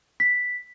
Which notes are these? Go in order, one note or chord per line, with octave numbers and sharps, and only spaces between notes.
B6